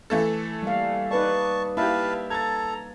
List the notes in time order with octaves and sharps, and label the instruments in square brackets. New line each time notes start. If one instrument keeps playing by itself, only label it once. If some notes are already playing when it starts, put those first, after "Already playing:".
[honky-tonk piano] E3 A3 A4
[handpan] G3 A#3 F5
[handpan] D#4 B4 D5 [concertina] A5 C#6
[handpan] A#3 [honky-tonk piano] E4 G4 [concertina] B4 F5 A5
[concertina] A4 A#5 [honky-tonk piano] G#6 A6